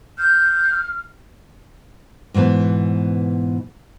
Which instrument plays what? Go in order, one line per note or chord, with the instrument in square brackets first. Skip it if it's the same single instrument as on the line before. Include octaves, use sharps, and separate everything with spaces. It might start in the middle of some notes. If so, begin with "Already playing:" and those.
[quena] F6 [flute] G6
[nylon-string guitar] G#2 B2 E3 B3